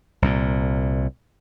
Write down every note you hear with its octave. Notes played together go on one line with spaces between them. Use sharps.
C2 A#2